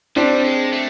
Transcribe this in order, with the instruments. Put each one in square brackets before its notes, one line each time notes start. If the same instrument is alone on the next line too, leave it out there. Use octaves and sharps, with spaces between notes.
[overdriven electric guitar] G3 [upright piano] C4 D4
[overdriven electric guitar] G#3
A3